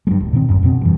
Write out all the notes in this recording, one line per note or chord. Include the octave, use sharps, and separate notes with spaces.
G2 F#3 G#3
D1
A#2 D#3 C4
F#1 C2 F#2
F2 B2 C4
G2 E3